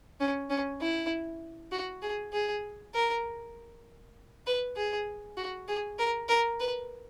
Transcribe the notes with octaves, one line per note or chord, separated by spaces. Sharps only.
C#4
C#4
E4
F#4
G#4
G#4
A#4
B4
G#4
F#4
G#4
A#4
A#4
B4